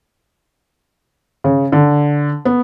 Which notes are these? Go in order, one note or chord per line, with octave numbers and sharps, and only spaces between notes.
C#3
D3
B3